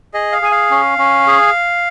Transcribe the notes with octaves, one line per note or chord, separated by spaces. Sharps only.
G#4 D#5
F5
G#4 G#5
F5
C#4
C#4
G#4